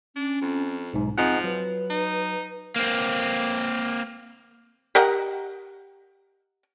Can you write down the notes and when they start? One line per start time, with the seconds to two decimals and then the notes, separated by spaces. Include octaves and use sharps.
0.16 C#4 D4
0.41 F2
0.94 B1 G#2 D#4
1.18 F3 C4 D#4 G#4 F#5
1.44 F#3 B4
1.90 D#4
2.76 A#3 C4
4.95 G4 A#4 D#5 F#5